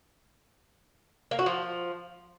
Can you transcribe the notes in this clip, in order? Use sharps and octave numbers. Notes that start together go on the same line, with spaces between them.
A#3
F#4
F3